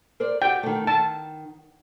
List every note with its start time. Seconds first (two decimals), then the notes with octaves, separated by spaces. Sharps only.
0.20 A#4 C5 D5
0.42 F#4 G4 G5
0.63 D#3 A3
0.87 D#3 A5